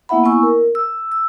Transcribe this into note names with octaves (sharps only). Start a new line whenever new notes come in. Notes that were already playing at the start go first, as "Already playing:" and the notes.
A#3 B3 E4 E5 F#5 B5
B3 E4 G#5 C#6 E6
A#4
E6
E6